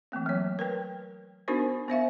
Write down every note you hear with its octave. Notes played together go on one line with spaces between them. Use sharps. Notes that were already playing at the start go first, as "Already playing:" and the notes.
E3 A3 A#3 C4
F#3 C#5
A#4 B4 G5
B3 D4 D#4 F#4 A#4 C5
B3 C5 E5 F5